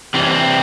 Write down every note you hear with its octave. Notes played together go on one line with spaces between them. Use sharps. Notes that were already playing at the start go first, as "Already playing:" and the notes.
C3 E3 G3 C4
C#4
C4